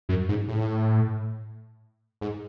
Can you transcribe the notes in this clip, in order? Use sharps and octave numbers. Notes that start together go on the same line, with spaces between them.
F#2
G#2
A2
G#2